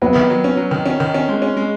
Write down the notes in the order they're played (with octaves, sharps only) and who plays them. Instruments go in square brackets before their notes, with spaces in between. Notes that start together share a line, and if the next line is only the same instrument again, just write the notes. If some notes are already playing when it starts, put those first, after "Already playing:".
[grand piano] F#3 [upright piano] B3
[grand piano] D#3
F#3
C#4
F#3
D#3
C#4
D#3
C#4
G#3
C#4
G#3